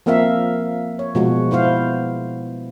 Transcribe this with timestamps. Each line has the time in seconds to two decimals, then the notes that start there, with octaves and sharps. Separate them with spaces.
0.06 F3 A#3 C4 A#4 E5 F5
0.99 C#5
1.15 B2 F3 G#3 F#4
1.51 B3 E4 C5 F5